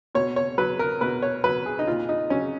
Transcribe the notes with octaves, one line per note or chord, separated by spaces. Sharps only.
B2 C#5
C#5
F#3 B4
A#4
B2 B4
C#5
F#3 B4
G#4
D#4
A#2 F4
D#4
F#3 C#4